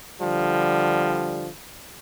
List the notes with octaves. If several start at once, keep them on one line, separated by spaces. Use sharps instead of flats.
D3 F3 G3